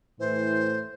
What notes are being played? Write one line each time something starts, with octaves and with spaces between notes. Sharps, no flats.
A2 E3 C5